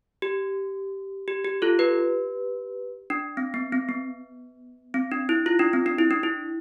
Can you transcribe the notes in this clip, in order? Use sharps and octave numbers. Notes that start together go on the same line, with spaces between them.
G4
G4
G4
F4 A4
G4 B4
D4
C4
B3
C4
B3
C4
D4
E4
F4
D4
C4
D4
E4
D4
E4